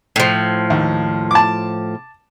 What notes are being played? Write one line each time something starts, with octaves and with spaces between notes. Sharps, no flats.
A2 F3
D#2
A5 D6